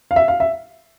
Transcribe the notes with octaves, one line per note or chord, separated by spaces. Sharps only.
F5
E5
F5
E5